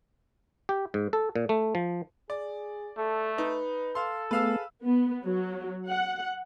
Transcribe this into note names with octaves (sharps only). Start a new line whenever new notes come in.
G4
G#2
A4
A#2
A3
F3
G#4 D5
A3 A4
D#4 B4
A4 F5 C6
A3 B3 G#4 B4 F5 E6
B3
F#3
F#5